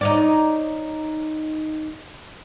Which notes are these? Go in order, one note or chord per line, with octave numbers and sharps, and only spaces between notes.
D#4 C#5 D5